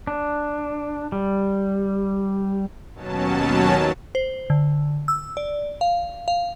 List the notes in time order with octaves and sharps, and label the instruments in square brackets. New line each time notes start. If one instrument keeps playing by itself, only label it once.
[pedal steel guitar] D4
G3
[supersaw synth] D#2 B2 F#3 C#4 A5
[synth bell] C5
D3
E6
D5
F5
F5